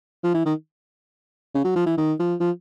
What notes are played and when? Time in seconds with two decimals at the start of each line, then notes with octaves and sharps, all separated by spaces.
0.23 F3
0.34 E3
0.46 D#3
1.55 C#3
1.64 F#3
1.76 F3
1.86 E3
1.97 D#3
2.19 F3
2.40 F3